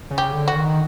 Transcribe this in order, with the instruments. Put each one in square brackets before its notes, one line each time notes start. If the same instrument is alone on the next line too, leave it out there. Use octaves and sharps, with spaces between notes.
[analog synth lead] C#3
[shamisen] G4
[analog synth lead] D3
[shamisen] F#4
[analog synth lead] D#3